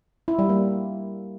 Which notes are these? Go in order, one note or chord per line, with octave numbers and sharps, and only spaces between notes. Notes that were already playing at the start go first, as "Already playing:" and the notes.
E4
G3
A#3